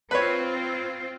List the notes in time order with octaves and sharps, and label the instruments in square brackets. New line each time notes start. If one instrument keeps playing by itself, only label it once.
[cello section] C4 F4 [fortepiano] B4 C#5